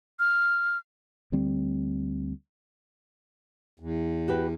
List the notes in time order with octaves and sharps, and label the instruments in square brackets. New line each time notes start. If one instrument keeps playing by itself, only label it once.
[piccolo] F6
[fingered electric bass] D2 D3 G3 C4
[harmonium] E2
[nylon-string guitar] F#4 G4 B4